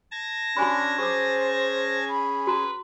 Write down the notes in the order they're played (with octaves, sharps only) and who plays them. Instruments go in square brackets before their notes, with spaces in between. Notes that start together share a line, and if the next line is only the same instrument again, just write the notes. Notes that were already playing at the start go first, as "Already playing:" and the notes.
[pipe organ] A5 G#6 A#6
[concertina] C#4 D4 [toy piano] F#4 G#5 B5
[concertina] C#4 G#4 [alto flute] C5 [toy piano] C#6 D6
[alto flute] B5
[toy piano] F#4 A#5 [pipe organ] B4